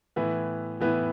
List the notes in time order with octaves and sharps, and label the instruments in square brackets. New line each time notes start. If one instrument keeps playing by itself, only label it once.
[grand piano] A2 E3 B3 E4 B4
A2 E3 B3 E4 B4